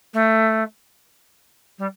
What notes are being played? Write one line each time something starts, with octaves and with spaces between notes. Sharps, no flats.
A3
G3